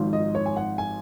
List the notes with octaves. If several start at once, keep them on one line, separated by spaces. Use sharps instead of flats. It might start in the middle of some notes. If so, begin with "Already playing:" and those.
Already playing: G#1 G#2 F3
D#5
C#5
G#5
F#5
G#5